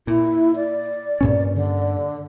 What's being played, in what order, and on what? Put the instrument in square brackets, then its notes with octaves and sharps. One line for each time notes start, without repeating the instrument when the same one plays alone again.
[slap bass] A#2 [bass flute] E4
[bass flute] D5
[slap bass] G2 A#2 C#4
[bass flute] D3